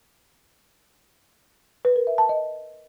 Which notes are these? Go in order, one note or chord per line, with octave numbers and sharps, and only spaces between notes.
B4
A#4
E5
A5
D#5